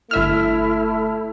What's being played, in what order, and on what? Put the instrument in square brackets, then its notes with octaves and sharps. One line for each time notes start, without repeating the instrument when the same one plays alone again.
[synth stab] G1 E5 F6 [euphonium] A3 [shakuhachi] E4